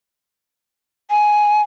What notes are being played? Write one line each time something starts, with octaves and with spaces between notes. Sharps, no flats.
G#5